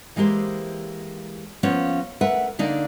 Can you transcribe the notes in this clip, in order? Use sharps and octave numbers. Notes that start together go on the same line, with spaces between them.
E3 G#3 A#3 G4 C5
F3 A#3 B3 C#4
A3 A#4 B4 E5 F#5
D3 A#3 D4 D#4